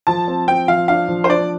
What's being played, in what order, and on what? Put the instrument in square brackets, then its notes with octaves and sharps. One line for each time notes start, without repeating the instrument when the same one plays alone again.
[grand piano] F3 [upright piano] A5
[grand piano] C4
[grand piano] C4 [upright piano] G5
[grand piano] F3 [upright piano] F5
[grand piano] D4 [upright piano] F5
[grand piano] F3
[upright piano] C5
[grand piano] D4 [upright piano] D5